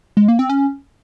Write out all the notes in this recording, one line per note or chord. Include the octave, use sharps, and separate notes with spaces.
G#3
A#3
C4
C#4